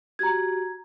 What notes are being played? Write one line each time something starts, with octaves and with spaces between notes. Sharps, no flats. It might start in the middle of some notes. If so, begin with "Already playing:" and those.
F#4 G4 A#5 G#6